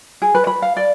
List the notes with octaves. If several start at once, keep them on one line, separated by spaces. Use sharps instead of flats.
G#4
B4
B5
F5
D5